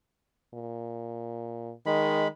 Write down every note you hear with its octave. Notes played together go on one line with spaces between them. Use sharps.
A#2
D#3 G#3 B5